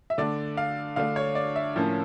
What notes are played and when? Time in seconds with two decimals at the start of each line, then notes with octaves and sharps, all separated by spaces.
0.10 E5
0.18 D3 A3 D4 D5
0.57 F5
0.96 D3 A3 D4 F5
1.16 C#5
1.35 D5
1.56 E5
1.76 A2 F3 A#3 C#4